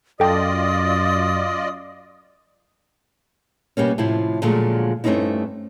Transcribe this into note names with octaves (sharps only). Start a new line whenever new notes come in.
F#2 F4 A4 D5 D#5 G5 A5 D#6
B2 G3 A#3 C#4
A2 C3 F3 E4
A#2 D3 F3 F#3 G#3 A3
G2 A3 C4 C#4 D#4 E4